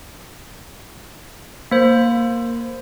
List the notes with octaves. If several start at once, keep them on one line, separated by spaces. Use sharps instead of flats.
A#3 C5